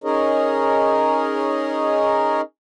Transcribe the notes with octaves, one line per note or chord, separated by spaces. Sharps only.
C#4 D#4 G#4 A#4 C#5 D#5